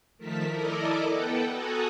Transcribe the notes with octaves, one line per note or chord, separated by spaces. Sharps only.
D#3 F3 A3 A#4 A5 B6
E4 A4 A#4 D5 D#5 D6
B3 A4 B4 F#5 G5
F#4 A4 G#5 A#5 D#6 F#6